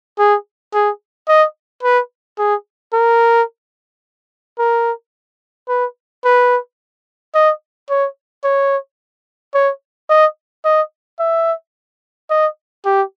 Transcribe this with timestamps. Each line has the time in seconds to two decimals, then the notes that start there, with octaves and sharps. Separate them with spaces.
0.19 G#4
0.74 G#4
1.28 D#5
1.83 B4
2.38 G#4
2.93 A#4
4.59 A#4
5.68 B4
6.25 B4
7.34 D#5
7.90 C#5
8.44 C#5
9.54 C#5
10.09 D#5
10.65 D#5
11.19 E5
12.30 D#5
12.85 G4